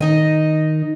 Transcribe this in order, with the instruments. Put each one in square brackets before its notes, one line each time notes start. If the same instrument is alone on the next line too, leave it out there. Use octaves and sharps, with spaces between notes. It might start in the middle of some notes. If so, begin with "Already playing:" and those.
[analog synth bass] D#3 [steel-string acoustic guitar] D#4 D#5